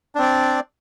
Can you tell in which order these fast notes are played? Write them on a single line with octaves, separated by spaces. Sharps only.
D4 C4 D5